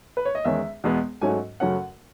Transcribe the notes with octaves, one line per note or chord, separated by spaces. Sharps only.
B4
C#5
D#5
E2 D#3 G#3 C#4 E5
E2 B2 G#3 B3
G#2 F#3 A3 C#4 G#5
F#2 C#3 F#3 A3 C#4 F#5